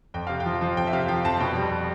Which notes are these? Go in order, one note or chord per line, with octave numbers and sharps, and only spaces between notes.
F2 G5
C3 F5
G5
F3
F3
F2 G5
E5
C3 F5
F3 G5
F2 A5
B2 G5
G3